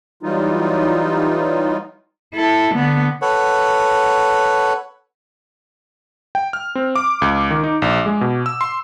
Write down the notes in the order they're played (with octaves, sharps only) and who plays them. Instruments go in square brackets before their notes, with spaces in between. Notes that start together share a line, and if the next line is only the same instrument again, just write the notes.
[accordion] E3 F#3 G3 D#4 F4
[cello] E4 A4
D3 B3
[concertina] A4 B4 C#5 F#5
[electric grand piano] G5
F6
C4
D6
C#2
D#3
D#4
A#1
G#3
B2
E6
C6